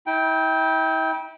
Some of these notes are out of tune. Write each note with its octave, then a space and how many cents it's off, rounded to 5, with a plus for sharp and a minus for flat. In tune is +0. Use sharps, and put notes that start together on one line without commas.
E4 -40 G5 +0